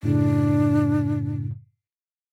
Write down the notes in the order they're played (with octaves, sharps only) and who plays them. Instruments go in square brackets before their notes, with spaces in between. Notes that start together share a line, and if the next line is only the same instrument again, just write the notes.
[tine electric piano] F#2 A2 C#3 [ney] D4